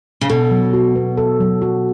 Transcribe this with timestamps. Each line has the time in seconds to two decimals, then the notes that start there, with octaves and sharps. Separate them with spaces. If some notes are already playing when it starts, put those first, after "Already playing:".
0.21 C#3
0.29 B2 A4
0.51 F#3
0.73 F#4
0.95 B3
1.17 A4
1.40 F#3
1.62 F#4